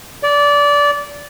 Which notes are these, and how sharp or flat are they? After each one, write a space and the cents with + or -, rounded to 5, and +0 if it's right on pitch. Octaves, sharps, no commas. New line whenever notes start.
D5 -20